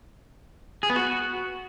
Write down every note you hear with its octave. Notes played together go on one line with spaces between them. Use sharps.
G#4
B3
F#4